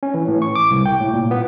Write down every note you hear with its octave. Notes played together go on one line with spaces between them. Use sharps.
C#4
E3
A2
C#6
D6
C2
G5
A2
A#2
B3